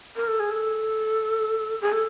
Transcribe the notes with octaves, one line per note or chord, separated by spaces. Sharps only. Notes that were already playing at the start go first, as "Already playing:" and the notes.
A#4
A4
G#4
A4
G#4
A4